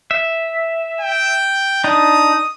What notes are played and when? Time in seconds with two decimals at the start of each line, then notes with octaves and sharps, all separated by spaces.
0.11 E5
1.01 G5
1.84 D4 D#4 D#6